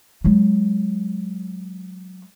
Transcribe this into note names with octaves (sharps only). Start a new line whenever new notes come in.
F#3 G#3